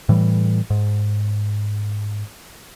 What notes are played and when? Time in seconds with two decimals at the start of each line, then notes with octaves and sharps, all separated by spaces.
0.09 A2 E3 G3
0.70 G#2